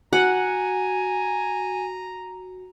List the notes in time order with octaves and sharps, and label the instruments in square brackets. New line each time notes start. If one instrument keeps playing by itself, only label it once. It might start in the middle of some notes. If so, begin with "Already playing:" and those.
[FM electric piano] F#4 [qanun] F#5 [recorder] G#5 [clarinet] A#5